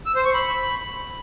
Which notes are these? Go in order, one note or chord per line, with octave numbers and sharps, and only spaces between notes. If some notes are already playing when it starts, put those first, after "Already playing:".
E6
C5
C#6
B5